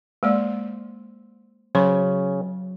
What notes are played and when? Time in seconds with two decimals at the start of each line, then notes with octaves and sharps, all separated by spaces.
0.23 G#3 A#3 C5 D5
1.75 C#3 F#3 C5 C6